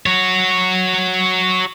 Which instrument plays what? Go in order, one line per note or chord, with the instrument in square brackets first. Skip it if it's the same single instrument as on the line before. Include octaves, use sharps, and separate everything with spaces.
[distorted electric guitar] F#4 C#5